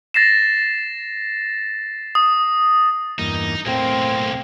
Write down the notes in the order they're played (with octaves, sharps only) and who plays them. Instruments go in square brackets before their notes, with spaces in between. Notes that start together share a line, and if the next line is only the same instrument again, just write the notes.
[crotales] A6 A#6 C7 E7
D#6
[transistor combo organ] E2 G2 A#3 [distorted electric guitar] D#4
[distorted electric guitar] B1 A#3 [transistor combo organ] A2 [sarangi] C4